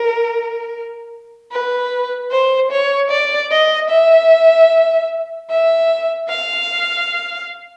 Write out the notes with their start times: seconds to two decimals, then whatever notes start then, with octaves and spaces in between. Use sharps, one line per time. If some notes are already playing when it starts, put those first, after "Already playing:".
Already playing: A#4
1.52 B4
2.31 C5
2.71 C#5
3.10 D5
3.51 D#5
3.90 E5
5.50 E5
6.29 F5